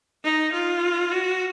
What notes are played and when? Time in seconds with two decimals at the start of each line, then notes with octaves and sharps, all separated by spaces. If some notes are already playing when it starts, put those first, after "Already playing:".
0.24 D#4
0.52 F4
1.11 F#4